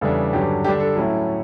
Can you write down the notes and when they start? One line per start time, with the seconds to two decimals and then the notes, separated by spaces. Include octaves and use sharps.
0.01 E2 C#3 G3 D4 A4
0.33 G2 D3 F#3 C#4 G4
0.64 D3 G3 D4 G4
0.80 A4
0.96 A2 F#3 C#4 E4